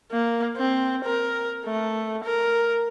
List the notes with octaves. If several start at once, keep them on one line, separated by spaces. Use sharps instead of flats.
A#3
C4
A#4
A3
A#4